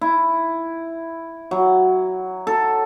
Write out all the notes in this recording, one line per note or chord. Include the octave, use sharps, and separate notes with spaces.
E4
F#3
A4